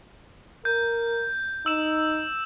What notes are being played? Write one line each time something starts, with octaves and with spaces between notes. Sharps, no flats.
A#4 G6
D#4 E6 E7